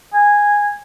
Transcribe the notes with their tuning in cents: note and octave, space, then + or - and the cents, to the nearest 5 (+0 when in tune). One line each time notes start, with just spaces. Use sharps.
G#5 -10